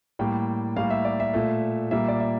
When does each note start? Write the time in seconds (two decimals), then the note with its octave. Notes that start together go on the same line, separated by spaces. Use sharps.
0.19 A2 G3 A#3 G5
0.76 A2 G3 A#3 F5
0.90 E5
1.05 D5
1.20 E5
1.34 A#2 A3
1.91 A#2 G3 A#3 E5
2.08 D5
2.20 E5